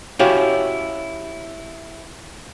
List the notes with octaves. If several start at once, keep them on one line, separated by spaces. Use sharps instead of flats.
C#4 E4 F#4 G4 C#5 F5